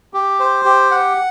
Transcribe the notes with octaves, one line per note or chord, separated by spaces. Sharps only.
G4
C5
G4
F#5